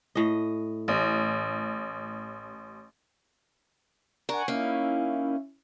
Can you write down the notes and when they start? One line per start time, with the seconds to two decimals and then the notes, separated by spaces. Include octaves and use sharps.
0.15 A2 D#5
0.88 A1
4.29 D4 A#4 F#5 G#5 C#6
4.48 A#3 C#4 D#4 E4